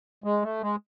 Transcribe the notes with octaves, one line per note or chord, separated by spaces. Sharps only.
G#3
A3
G#3